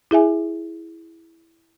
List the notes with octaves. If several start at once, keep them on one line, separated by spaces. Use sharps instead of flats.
E4 G#4 E5 G#5